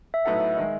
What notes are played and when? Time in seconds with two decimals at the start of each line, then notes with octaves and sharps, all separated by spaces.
0.14 E5
0.25 A2 F#3 B3 D#4 A4 F#5
0.40 E5
0.56 D#3 G#3 D#5